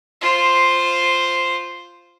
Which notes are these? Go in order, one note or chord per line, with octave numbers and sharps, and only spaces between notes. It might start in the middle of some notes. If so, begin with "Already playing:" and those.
F4 C5